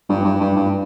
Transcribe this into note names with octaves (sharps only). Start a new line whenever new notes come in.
G2
G2
G2
G2